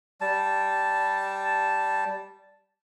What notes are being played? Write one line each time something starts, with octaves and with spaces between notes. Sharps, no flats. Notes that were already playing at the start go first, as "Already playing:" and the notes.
G3 A5